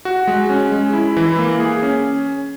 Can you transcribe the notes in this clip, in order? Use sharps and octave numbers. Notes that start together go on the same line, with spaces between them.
F#4
G#3
C#4
G#3
E4
E3
A#3
G#4
C#4